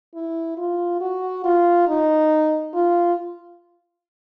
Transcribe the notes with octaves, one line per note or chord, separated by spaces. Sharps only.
E4
F4
F#4
F4
D#4
F4